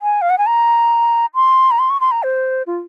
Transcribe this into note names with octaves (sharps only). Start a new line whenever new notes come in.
G#5
F5
F#5
G#5
A#5
C6
A#5
C6
C#6
C6
A#5
C5
F4